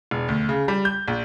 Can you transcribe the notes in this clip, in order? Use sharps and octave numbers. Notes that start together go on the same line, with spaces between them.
E1
D2
C#3
G3
G6
A#1